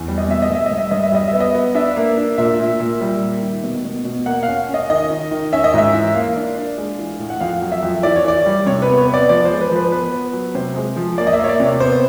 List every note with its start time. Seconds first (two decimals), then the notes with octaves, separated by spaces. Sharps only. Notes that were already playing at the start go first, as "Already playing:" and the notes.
Already playing: E2
0.08 G3
0.18 D#5
0.28 B2 E5
0.42 D#5
0.50 G2
0.55 E5
0.66 G2 D#5
0.78 E5
0.91 G2 D#5
1.03 E5
1.12 G3 D#5
1.28 E5
1.33 B3
1.40 D#5
1.55 B3
1.75 D4 E5
1.96 A#3
2.17 D4
2.38 A#2 E5
2.59 A#2
2.80 A#2
3.01 G3
3.22 A#3
3.42 D#3
3.64 B2
3.85 B2
4.05 B2
4.26 A#3 F#5
4.43 C#4 F5
4.69 C#4
4.74 D#5
4.90 D#3 D#5
5.10 D#3
5.31 D#3
5.53 C#4 E5
5.64 D#5
5.74 G#2 E5
5.94 E3
6.15 A#3 F5
6.36 D4
6.57 D4
6.78 G#3
6.98 E3
7.19 A2
7.30 F#5
7.41 F2 F5
7.62 F#3
7.72 E5
7.82 F2
8.03 E3 D5
8.16 C#5
8.24 E3 D5
8.45 G3
8.66 C3 C#5
8.82 B4
8.87 B3
8.98 C#5
9.08 B3
9.14 D5
9.29 F3 D5
9.45 C5
9.50 G#3
9.61 B4
9.71 F3 B4
9.91 B3 B4
10.13 B3
10.33 F#3
10.55 C3 C5
10.76 G#3
10.96 F3
11.18 A#3 D5
11.27 D#5
11.33 E5
11.39 A#3
11.44 C#5
11.49 D5
11.60 C3 C#5
11.80 B3 C5